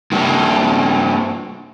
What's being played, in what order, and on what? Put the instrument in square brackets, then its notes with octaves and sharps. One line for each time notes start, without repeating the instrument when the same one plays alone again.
[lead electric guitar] G2 A#3